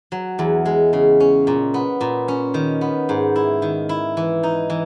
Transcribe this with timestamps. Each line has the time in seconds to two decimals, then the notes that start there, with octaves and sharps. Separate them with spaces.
0.12 F#3
0.39 E2
0.66 G#3
0.93 C#3
1.20 C#4
1.47 A#2
1.74 B3
2.01 A#2
2.28 C#4
2.54 D#3
2.81 B3
3.09 G#2
3.36 E4
3.62 D#3
3.89 E4
4.17 E3
4.43 D#4
4.70 E3